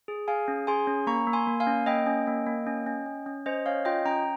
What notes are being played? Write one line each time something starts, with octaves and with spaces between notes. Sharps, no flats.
G#4
G#4 F5 G#5
C#4
G#4 G#5 C6
C#4
A#3 A#5 C#6
A#3
G#5 C6
A#3
F5 G#5
C#4
A#3 D#5 G5
C#4
A#3
A#3
C#4
C#4
C#4
C#4
C#4 C5 D#5
C#4 C#5 F5
F4 D#5 G5
C#4 G5 A#5